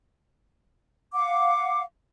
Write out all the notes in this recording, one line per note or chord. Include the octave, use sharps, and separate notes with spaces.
F5 F#5 D6